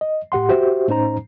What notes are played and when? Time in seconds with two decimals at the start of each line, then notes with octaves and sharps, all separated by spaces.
0.01 D#5
0.32 A2 G4 F#5 C6
0.49 F#4 G4 C5 E5
0.88 A2 C#4 D#4 C5 A#5